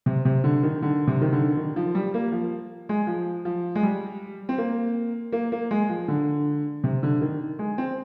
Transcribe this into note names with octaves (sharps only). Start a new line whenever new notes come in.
C3
C3
D3
D#3
D3
C3
D#3
D3
D#3
F3
G3
A#3
F3
G#3
F3
F3
G#3
G3
C4
A#3
A#3
A#3
G#3
F3
D3
C3
D3
D#3
G#3
C4